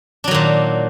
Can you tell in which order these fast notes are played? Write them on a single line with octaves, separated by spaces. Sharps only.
D4 F#3 D#3 A#2